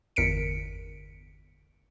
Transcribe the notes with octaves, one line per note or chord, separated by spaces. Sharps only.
G1 E2 A#4 B6 C#7 D7